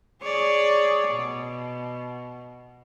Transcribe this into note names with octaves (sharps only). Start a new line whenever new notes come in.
G#4 C#5 D5
B2